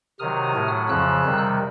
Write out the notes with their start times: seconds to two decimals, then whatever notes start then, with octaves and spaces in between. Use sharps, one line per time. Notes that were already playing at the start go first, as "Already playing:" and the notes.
0.19 C3 D#3 F#3 D#6 F6
0.54 A2 F#3 A3
0.89 F2 C#3 F3 E6 F#6
1.24 C3 D#3 G3